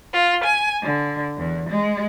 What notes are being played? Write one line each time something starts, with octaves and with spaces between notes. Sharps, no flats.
F4
G#5
D3
E2
G#3